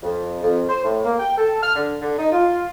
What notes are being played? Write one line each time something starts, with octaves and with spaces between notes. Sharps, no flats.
F2
F2
C5
A2
A#3
G5
A4
F6
D3
D3
D#4
F4